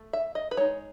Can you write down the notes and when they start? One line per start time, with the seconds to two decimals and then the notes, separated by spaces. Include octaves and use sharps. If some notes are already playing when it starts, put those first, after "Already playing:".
Already playing: A3
0.13 E5
0.35 D#5
0.51 B4
0.57 G#3 D#4 C#5